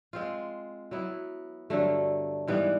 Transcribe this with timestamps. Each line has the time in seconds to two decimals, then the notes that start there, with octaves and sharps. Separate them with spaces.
0.13 G#3 C4 F4
0.91 F#3 B3 E4
1.70 G2 D3 F#3 A3
2.48 G#2 E3 G3 B3